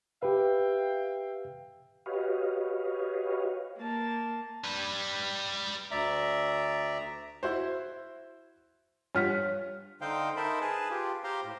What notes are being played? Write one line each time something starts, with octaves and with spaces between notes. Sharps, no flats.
G4 B4 E5 F5 G5
F#4 G4 B4 C#5 D#5 F5
A#3 A5
G3 B4
D2 D5 E5 A#5
E4 F#4 C5
G2 F4 C#5 F#5 F6 B6
D3 D#4 C5 F5 G5
D#4 A#4 C5 E5 A5 B5
G#4 B4 A5
F4 G4
G4 C5 F5 A#5 C6
A2